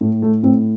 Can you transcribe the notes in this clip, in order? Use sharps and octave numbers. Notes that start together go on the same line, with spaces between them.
A2 A3
A3
A2 C4